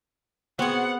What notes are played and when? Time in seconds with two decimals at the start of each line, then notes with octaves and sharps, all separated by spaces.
0.59 B3 C4 F#4 G#4 F#5